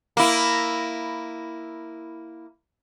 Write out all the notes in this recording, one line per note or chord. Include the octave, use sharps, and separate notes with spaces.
A#3 E4